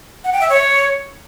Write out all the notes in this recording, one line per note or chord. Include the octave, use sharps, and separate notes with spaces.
F#5
G5
E5
C#5